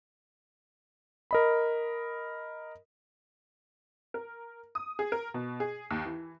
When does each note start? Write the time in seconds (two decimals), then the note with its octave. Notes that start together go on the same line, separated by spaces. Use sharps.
1.31 A#4 D#5 B5
4.14 A#4
4.75 D#6
4.99 G#4
5.12 A#4
5.34 B2
5.60 G#4
5.91 D#2
6.05 E3